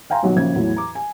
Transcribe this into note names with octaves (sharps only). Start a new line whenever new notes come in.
F5 G5 G#5 A#5 C6
D#1 B1 F#3 F#4
A#1 C#3 G#6
E2 A2 E3 F#3
A#5 D6
G#5